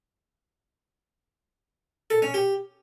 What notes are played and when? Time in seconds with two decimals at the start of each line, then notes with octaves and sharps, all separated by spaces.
2.10 A4
2.22 C#4
2.34 G4